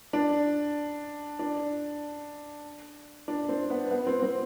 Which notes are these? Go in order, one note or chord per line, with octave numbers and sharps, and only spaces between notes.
D4
D4
D4
C4
B3
B3
C4
C4